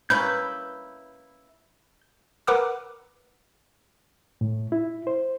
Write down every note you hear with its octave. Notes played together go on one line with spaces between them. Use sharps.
A#3 C#4 E4 B4 G6
A#4 B4 F#5 D6 E6
A2
E4
C5